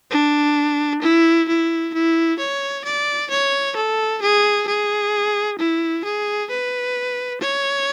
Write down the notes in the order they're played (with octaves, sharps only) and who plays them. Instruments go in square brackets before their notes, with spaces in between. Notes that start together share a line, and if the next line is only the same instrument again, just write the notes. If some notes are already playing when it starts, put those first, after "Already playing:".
[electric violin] D4
E4
E4
E4
C#5
D5
C#5
A4
G#4
G#4
E4
G#4
B4
C#5